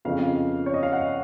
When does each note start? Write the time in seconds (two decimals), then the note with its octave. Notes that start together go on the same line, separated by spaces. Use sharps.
0.05 F2 C#3 F3 B3 D#4 F5
0.66 C#5
0.74 D#5
0.83 F5
0.93 F#5